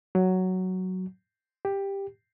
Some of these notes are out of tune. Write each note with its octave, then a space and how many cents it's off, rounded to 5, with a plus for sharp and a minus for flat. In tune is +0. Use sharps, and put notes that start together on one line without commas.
F#3 +5
G4 +10